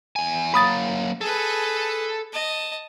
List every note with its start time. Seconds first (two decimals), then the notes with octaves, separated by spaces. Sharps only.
0.16 E2 G#5
0.54 F#3 A#3 B5 D#6 A6
1.21 G#4 A4 B4
2.33 D#5 A5